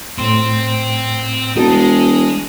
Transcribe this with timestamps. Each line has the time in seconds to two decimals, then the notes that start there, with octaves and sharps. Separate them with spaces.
0.18 A2 C4 C6
1.56 E1 D#4 F#4 A5
1.69 G#3